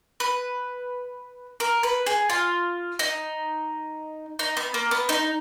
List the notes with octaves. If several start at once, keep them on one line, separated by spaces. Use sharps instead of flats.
B4
A#4
B4
G#4
F4
D#4
D#4
B3
A#3
B3
D#4